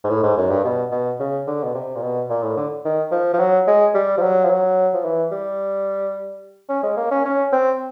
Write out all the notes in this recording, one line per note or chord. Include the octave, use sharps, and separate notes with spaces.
G#2
A2
G#2
F#2
G2
B2
B2
C#3
D3
B2
C3
A#2
B2
A#2
A2
D3
D#3
F3
F3
F#3
G#3
G3
F3
F#3
F3
F#3
F3
E3
G3
C#4
G#3
A#3
C#4
C#4
C4